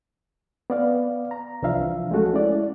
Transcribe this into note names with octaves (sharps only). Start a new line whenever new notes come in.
B3 D5 F5
A#5
C2 E3 F3 D4 E5 F5
G#3 A3 C#4 F#4 A4 F#5
G#3 C#4 E4 D5